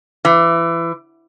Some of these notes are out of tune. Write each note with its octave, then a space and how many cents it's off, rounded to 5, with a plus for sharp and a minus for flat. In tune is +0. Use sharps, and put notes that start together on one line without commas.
E3 +25